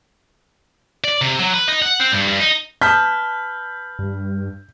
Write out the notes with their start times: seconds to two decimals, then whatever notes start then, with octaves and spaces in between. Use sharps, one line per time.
1.04 D5
1.22 C3
1.39 F#3
1.53 B4
1.68 D#4
1.82 F#5
2.00 C4
2.12 G2
2.28 G2
2.40 D#4
2.81 B4 A5 D#6 F6 G6 B6
3.99 G2